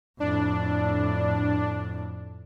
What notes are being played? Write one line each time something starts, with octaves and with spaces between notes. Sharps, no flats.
F2 A2 D4